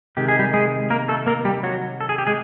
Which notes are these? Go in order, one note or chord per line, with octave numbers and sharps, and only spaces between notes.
C3 D#3 G#3 G4
G#4
G3 G4
G#3 G#4
A#3 A#4
A3 A4
A#3 A#4
G3 G4
F#3 F#4
A4
G#4
G4
G#3 G#4